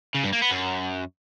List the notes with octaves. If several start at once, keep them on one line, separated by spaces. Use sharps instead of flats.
C#3
G2
A#3
B3
F#2